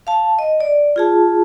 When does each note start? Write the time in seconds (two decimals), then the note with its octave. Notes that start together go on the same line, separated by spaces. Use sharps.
0.07 F5 A5
0.39 D#5
0.60 D5
0.96 F4 G#4 A5